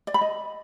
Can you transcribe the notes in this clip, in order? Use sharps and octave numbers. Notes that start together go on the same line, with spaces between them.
D5
B5
D#5